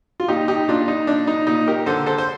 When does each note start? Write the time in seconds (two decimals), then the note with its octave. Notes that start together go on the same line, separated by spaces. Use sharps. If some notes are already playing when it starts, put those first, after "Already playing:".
0.20 F4
0.28 A#2 D#4 G4
0.48 D#4 G4
0.68 A#2 D4 F4
0.88 D#4
1.07 A#2 D4
1.27 D#4
1.47 A#2 D#4
1.67 G4 A#4
1.86 D3 A4 C5
2.06 A4 C5
2.18 C5